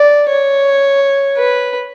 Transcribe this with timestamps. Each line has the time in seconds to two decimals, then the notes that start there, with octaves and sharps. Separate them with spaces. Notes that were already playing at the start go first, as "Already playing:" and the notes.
Already playing: D5
0.29 C#5
1.37 B4